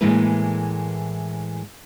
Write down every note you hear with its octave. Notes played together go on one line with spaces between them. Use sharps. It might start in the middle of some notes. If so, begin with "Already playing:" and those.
A2 E3 G#3 A#3 E4 B4